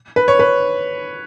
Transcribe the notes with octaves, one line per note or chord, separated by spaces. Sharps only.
B4
C#5
B4